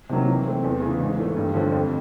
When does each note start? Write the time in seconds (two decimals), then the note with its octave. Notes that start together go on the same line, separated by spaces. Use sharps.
0.09 C3 D#3 F#3 A#3
0.27 E3
0.45 A3 C4
0.64 E2
0.82 C#3 E3
1.00 G#2
1.18 E3 A3
1.36 G2
1.54 D3 F3 A3
1.72 F2